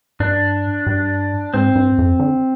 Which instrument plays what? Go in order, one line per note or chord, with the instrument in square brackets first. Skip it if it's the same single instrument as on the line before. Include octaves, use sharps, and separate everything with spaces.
[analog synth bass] G2 [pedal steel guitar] D4
[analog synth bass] G2
[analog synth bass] G#2 [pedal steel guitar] C4
[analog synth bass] G2
F2
D3